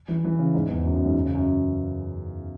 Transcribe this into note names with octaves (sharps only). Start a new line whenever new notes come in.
E3
E3
C#3
G#2
E2
F#2
F#2
G#2
C#3
F#2